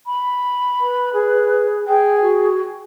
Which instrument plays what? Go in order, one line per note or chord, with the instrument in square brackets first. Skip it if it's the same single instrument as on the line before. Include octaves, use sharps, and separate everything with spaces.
[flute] B5
[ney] B4
[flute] G#4
[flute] G#4 [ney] G5
[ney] F#4